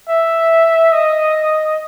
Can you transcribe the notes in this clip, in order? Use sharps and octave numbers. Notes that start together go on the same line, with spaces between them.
E5
D#5